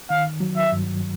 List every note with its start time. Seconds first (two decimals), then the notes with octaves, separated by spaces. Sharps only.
0.10 D#3 F5
0.40 F#3
0.56 E5
0.72 G2